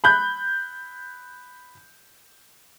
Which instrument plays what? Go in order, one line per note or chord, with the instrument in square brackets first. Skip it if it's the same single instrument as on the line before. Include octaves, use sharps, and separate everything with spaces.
[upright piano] B5 F#6 G6